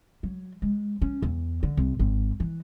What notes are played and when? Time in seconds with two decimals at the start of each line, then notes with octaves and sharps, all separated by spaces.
0.23 F#3
0.62 G#3
1.02 C#4
1.22 E2
1.63 D3
1.77 C2
1.99 G#1
2.40 E3